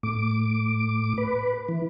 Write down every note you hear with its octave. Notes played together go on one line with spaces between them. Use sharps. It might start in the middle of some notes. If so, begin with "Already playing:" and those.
A2 D6
B4
E3